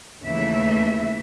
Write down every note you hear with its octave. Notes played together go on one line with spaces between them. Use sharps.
D#2 C#3 E3 A3 E5